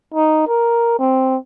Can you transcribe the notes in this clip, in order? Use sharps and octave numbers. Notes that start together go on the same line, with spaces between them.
D#4
A#4
C4